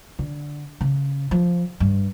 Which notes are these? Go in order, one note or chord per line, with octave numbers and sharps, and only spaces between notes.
D3
C#3
F3
G2